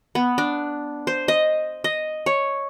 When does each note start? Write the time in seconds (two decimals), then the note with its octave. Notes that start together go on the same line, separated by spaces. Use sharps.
0.15 B3
0.38 D4
1.07 C5
1.28 D#5
1.84 D#5
2.26 C#5